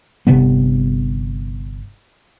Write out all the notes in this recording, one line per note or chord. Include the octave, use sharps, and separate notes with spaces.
G1 C3 G3 B3